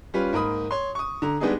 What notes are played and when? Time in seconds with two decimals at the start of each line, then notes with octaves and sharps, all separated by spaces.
0.14 G3 C#4 F4 B4
0.33 G#2 A#3 A#4 B5 D#6
0.71 C#5 C6
0.95 C#6 D#6
1.22 D3 A#5
1.40 G3 G#3 B3 D4 D#4 G#4